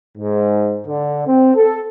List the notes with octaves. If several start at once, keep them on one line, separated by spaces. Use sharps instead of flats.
G#2
D3
C4
A4